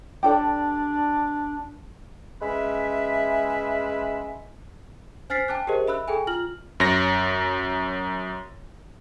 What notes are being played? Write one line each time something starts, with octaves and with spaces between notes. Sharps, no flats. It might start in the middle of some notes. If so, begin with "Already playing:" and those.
D4 G4 A4 D5
G#3 C#4 B4 E5
C5 G#5 F6 A6 B6 C7
G5 A5 D6 F#6
G4 G#4 A#4 C5 D#5
E5 B5 E6 F#6
G#4 A4 G5 G#5
F4 F6 F#7
F#2 C#5 A#6